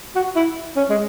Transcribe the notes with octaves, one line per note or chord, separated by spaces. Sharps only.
F#4
E4
C#4
G#3